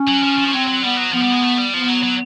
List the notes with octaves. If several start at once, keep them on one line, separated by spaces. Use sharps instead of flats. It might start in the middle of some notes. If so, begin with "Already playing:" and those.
Already playing: C#4
F#3
F3
F3
C#4
F#3 C4
F#3
G3 B3
F#3
F3 B3
G3
G#3
A3
G3
F3 B3
F#3
F#3